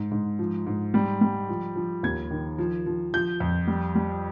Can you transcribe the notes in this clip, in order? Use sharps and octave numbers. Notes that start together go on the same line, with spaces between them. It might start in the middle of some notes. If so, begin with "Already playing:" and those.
Already playing: G#2
G#2
F3
G#2
G3
G3
F3
F3
D#2 G#6
D#3
F3
F3
F3 G6
F2
G3
G3